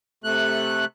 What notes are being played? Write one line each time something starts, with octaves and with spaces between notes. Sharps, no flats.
C3 A3 F#6